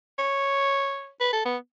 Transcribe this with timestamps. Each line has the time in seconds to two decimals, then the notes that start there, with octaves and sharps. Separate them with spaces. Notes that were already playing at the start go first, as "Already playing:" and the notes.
0.19 C#5
1.20 B4
1.33 A4
1.45 B3